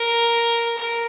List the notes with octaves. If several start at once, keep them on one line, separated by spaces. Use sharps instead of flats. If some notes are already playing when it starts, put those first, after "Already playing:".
Already playing: A#4
A#4